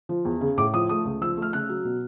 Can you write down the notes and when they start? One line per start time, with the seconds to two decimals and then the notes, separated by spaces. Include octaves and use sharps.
0.09 F3
0.25 E2
0.41 C#3
0.57 A2 D6
0.73 F3 D#6
0.89 A3 D#6
1.05 C#2
1.21 F3 E6
1.37 A3
1.42 F6
1.53 C#3 F#6
1.69 F#3
1.85 B2